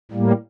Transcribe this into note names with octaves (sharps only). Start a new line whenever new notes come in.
A2 G3 A#3